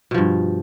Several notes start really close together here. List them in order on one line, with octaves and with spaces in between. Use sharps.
B2 F3 G2